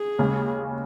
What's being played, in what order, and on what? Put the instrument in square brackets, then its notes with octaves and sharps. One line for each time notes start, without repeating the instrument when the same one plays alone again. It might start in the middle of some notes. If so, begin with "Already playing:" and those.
Already playing: [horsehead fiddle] G#4
[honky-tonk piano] D#2 C#3 G#3